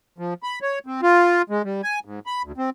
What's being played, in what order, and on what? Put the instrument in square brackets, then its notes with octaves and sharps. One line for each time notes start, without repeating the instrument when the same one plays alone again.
[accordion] F3
B5
C#5
C4
F4
G#3
G3
G#5
G#2
B5
D2
C4